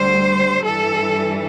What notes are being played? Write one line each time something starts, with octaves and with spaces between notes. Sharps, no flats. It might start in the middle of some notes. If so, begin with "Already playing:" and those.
Already playing: D2 D3 G3 C5
G2 E3 G3 A4